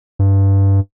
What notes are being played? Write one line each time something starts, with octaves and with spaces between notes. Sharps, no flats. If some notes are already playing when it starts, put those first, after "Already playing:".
G2